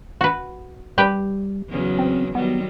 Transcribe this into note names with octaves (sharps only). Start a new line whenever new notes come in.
F#4 B4
G3 G4 B4 G5
E2 C#3 F#3
C4
D#3 F#3 G3 B3